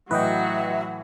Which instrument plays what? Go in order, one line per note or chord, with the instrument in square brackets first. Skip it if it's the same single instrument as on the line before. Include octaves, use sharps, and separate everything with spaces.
[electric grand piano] A2 E3 [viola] F#3 F#4 [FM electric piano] B4 D#5 G5 [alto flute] E5